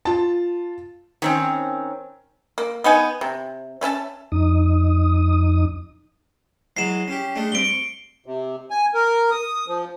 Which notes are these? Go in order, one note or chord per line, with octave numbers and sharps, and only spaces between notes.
F4 A5
D#3 C4 C#4
A#3
B3 D#4 G#5
C3
A3 C#4 E5 A5
F2 D#4 D#6
E3 F#3 G#3 C7 E7
C#4 G4
G#3 A3 D4
G2 C4 D7 G7
C#6
C3
G#5
A#4
D#6
F3